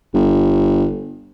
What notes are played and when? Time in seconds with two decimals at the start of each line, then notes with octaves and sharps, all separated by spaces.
0.14 G1